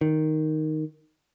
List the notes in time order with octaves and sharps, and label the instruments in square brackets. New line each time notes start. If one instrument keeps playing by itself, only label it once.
[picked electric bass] D#3